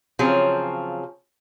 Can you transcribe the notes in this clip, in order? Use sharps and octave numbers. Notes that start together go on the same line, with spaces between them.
C#3 F3 F#3 C4 F4 G#4